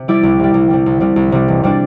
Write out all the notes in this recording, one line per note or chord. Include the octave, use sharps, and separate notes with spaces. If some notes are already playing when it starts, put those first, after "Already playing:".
Already playing: C3
G3 E4 G4 D5
C2
C3 G3
C2
C3 G3
C2
C3 G3
C2
C3 G3
E1
C3 G3 D4